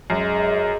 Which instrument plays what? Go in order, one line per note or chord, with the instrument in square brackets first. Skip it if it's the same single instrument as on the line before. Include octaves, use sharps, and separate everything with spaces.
[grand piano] F#2 [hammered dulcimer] G#3